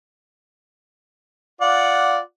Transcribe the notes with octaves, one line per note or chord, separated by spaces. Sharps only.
F4 D5 F#5